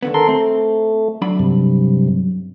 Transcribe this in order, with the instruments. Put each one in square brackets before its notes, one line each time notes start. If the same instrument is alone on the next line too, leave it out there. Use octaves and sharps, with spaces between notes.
[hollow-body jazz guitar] D#2 D3 B3
[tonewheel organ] A4 A#4 C6
[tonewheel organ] A3 [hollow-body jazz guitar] C4
[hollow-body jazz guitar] F#3 D4 B5
[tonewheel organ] G2 C3